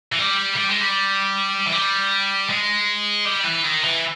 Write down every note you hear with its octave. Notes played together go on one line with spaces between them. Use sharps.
E3
G3
G3
G#3
G3
E3
G3
G#3
G3
E3
D#3
E3